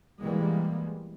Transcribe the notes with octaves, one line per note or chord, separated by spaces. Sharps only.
B2 E3 G3 G#3 A#3 B3